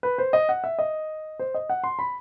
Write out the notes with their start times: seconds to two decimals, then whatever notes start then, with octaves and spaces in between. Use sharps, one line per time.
0.03 B4
0.18 C5
0.33 D#5
0.49 F#5
0.64 E5
0.79 D#5
1.39 C5
1.54 D#5
1.69 F#5
1.84 C6
1.99 B5